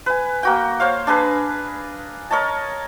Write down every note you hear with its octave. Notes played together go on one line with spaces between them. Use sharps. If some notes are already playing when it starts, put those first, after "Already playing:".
B4 G#5
A#3 F#4 G5
C5 C#5 F5
D4 G#4 B4 A#5
A#4 C#5 D#5 A5